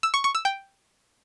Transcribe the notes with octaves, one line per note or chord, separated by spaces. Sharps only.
E6
C#6
C#6
E6
G5